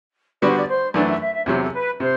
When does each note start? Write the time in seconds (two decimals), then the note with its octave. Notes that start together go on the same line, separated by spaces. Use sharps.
0.42 D3 G3 B3 F#4 D5
0.50 C5
0.57 D5
0.69 C5
0.94 F#2 E3 A3 D4 D5
1.08 E5
1.20 E5
1.33 E5
1.46 E2 C3 F#3 C5
1.62 A4
1.73 B4
1.99 C3 C5